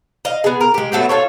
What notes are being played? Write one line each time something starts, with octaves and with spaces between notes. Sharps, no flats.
D#5 F5
B3 G#4
A#4
G#3 G4
F#3 A3 B3 C4
F4 F#4 A4 C#5